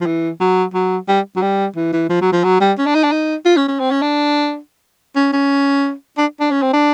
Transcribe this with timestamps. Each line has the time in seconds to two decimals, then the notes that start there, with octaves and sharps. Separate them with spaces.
0.01 F3
0.06 E3
0.40 F#3
0.74 F#3
1.08 G3
1.36 F#3
1.42 G3
1.76 E3
1.93 E3
2.10 F3
2.21 F#3
2.33 F3
2.44 F#3
2.61 G3
2.78 C#4
2.86 D4
2.95 D#4
3.03 D4
3.12 D#4
3.45 F4
3.57 C#4
3.68 C#4
3.80 C4
3.91 C#4
4.02 D4
5.16 C#4
5.33 C#4
6.18 D4
6.40 D4
6.51 C#4
6.62 C4
6.73 D4